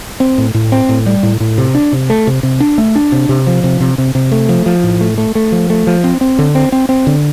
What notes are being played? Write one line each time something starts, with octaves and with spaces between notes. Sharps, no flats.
C4
A2
A2
C4
A2
G3
A2
A2
C3
D4
C3
A3
C3
C3
D4
A3
D4
C3
C3
F3
C3
C3
C3
C3
A3
F3
F3
A2
A3
A3
A3
F3
A3
F3
C4
C4
D3
C4
C4
C4
D3